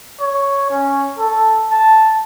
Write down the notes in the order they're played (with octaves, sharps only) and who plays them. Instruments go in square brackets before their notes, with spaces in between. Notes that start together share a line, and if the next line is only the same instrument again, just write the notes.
[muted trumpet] C#5
C#4
A4
A5